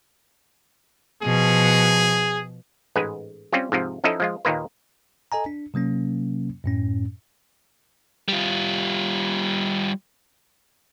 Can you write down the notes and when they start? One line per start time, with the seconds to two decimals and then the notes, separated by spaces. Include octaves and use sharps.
1.23 B2 F3 G#4
2.96 A1 G#2 G#3 B4 G#5
3.53 G3 C4 C#4 F4 G4
3.72 G#2 C3 F3
4.04 F3 C#4 D#4 E4 A4 D#5
4.20 F3 G#3 F4
4.45 D#2 A#2 D#3 A#3 B4
5.32 A4 D#5 G#5 A#5
5.46 D4
5.74 C3 F#3 A#3 C#4
6.64 F#2 A2 C#4
8.29 G3 F4